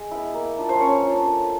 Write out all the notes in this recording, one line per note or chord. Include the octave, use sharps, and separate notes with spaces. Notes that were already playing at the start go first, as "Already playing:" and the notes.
Already playing: G#3
B3 E4
A#3
D4 F4
C5
A#3 C#4 C#5
D4 F4
A3